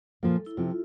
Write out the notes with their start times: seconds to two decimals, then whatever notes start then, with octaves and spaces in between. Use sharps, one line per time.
0.23 A#2 F3 A#3 A4
0.46 E4
0.57 C3 F3 C4 F4